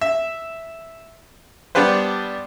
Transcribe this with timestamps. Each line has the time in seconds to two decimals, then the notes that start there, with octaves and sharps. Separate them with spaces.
0.01 E5
1.75 G3 B3 D4 G4 B4 C5